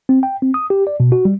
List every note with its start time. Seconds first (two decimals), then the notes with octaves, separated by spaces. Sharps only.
0.09 C4
0.23 G5
0.42 C4
0.54 D#6
0.70 G4
0.87 D5
1.00 B2
1.12 F#4
1.25 G3